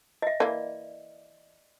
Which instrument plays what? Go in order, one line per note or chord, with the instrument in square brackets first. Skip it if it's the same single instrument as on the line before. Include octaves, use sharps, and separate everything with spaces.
[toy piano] D#5 E5
[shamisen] E3 A#3 [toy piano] D5